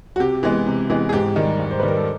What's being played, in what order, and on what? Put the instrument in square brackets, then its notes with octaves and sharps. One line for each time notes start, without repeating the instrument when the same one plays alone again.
[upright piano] F#4
C3 G4
E3 G#3 B3
C3
E3 G#3 B3
G#4
G#2 G4
D#3 G3
G#2
C5
D#3 G3 B4
A#4
A4